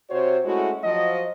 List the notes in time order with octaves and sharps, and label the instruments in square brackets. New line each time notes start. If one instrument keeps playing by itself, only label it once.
[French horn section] C3 F#4 C5 C#5
G#3 A3 C#4 E4 F#4
F3 F#3 D#5